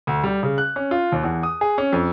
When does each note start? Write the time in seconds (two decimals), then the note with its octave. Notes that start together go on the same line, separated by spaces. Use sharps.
0.07 D2
0.24 G3
0.43 C#3
0.58 F#6
0.76 C#4
0.91 F4
1.12 D#2
1.24 E2
1.43 D#6
1.61 G#4
1.78 C#4
1.93 F2